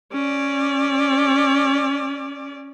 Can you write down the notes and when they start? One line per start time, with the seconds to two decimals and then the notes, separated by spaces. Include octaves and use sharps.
0.12 C#4 D5